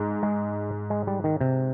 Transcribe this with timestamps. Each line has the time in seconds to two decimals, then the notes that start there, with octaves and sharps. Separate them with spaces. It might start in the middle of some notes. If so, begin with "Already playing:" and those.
Already playing: G#2
0.23 G#3
0.90 G#3
1.07 G3
1.24 D#3
1.41 C3